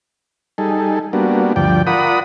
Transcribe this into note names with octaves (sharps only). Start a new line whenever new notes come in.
G3 D#4 G#4 A4
G3 A#3 B3 D4 F#4
D2 G2 F3 D5 G5
F4 A#4 D5 F#5 B5 D#6